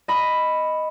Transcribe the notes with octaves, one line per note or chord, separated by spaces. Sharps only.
D#5 B5